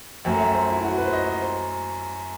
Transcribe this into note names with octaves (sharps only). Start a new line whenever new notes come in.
F#2 F#3 A3 G5
E5
C5
E4
F#4
B4
C5
D#5
D#5
C5